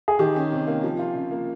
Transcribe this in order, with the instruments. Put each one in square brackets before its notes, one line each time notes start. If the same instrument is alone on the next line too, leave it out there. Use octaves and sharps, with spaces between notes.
[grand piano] G#4
[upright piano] D#3 [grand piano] G4
[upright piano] C#4
C3
A#3
F3
F4
C#3
A#3